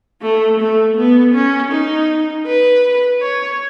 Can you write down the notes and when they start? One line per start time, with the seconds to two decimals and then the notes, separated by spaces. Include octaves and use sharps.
0.22 A3
0.59 A3
0.97 B3
1.34 C#4
1.72 D#4
2.46 B4
3.21 C#5